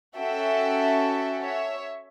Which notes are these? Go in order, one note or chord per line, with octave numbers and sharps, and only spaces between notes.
C#4 F#4 A4 E5 G5
C#5 E5